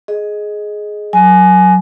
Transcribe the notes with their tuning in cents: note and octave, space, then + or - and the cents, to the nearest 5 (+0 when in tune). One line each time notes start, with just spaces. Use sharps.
G#4 +15 D#5 +0
F#3 +0 G#5 +20